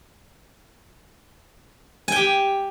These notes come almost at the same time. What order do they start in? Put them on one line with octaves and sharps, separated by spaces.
G#5 G5 G4